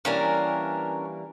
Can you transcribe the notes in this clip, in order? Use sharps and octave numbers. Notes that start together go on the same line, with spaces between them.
E3 G3 A#3 C#4 D4 A#4